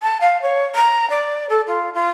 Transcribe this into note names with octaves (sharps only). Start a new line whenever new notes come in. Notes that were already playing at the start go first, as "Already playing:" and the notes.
A5
F5
C#5
A#5
D5
A4
F4
F4